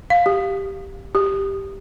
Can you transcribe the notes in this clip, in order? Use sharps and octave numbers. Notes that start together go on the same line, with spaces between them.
F5
G4
G4